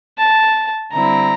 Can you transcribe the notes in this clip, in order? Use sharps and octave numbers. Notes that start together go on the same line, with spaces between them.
A5
D3 G3 C4 E4 A#5